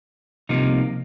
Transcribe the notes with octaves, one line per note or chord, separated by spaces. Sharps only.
C2 C3 F3 A#3 D#4